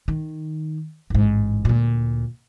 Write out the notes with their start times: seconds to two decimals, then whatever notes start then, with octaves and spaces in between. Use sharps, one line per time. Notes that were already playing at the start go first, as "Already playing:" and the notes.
0.08 D#3
1.10 A1 G#2
1.65 D2 A#2